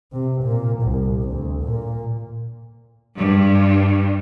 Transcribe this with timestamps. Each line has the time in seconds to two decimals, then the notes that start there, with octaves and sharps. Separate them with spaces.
0.12 C3
0.43 A#2
0.82 C2
1.29 D2
1.63 A#2
3.18 G2